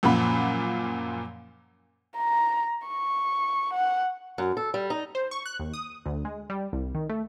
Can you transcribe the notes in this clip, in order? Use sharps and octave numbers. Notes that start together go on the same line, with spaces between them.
F#2 A#2 F3 F#5 B5
A#5
C#6
F#5
F#2
A4
G3
D#4
C5
C#6
F#6
D#2
D#6
D2
G#3
G3
C2
D#3
A3